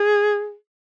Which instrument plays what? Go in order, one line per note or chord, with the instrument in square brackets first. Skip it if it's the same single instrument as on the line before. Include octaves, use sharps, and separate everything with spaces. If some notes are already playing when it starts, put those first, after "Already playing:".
Already playing: [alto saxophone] G#4